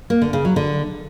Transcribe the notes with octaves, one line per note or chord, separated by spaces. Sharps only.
A#3
D3
C#3
F#3
D3